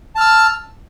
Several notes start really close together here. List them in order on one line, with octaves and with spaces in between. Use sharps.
A5 F6 E6